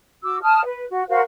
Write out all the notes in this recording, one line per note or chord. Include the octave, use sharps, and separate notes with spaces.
F#4 D6 E6
A5 D#6 F6
B4
F#4
F#4 A#4 C5 F5